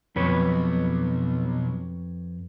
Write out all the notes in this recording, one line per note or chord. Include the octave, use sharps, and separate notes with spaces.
B1 F2 B4 C#5